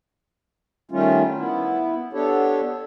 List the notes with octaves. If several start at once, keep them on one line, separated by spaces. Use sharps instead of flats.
D#3 G3 A3 C#4 F4
B3 E4
B3 D4 G4 A4 C#5